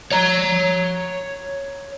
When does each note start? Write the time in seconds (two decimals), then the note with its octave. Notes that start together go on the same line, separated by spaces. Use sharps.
0.12 C#5 A#5